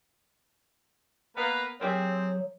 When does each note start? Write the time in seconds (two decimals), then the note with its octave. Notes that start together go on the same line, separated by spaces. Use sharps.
1.37 A#3 B3 B4 F5
1.81 F#3 A#3 C4 G4 G#4